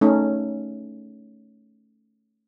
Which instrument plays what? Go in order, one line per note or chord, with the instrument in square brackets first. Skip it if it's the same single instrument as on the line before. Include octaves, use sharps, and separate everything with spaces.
[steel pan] A3 C#4 D#4